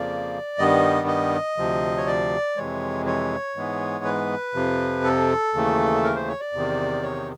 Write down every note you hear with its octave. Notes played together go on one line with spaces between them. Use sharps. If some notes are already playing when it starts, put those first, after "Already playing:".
Already playing: F2 C#3 F3 A#3 D5
G2 D#3 G3 B3 D#5
D#5
D2 C3 F3
C#5
D5
F2 C3 E3 G#3 C#5
C#5
G#2 E3 G#3 B3
B4
F2 C3 F3
A4
D#2 C#3 E3 A3
A#4
C5
C#5
D5
E2 C3 D#3
C#5